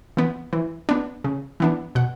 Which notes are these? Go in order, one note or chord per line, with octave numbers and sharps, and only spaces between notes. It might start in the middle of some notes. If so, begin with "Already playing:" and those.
E3 B3
E3
B3 D4
C#3
E3 B3 D4
B2 F#5